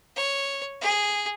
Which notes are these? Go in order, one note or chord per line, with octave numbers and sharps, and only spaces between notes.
C#5
G#4